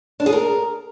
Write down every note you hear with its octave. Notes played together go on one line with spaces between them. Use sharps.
D4
G#4
A#4